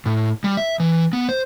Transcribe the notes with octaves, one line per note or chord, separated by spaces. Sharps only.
A2
G3
E5
E3
B3
C5